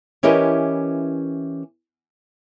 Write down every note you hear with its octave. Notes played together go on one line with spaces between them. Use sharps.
E3 C#4 E4 G4 A#4 D#5